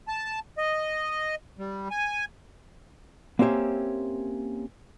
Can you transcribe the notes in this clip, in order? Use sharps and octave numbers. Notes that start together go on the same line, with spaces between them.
A5
D#5
G3
G#5
A#3 C4 C#4 G4 E5